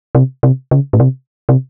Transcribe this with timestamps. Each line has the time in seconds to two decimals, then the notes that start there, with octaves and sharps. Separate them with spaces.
0.15 C3
0.43 C3
0.71 C#3
0.93 A2
1.00 C3
1.49 C3